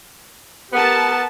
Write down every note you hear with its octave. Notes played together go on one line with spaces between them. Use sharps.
B3 G4 A#4 A5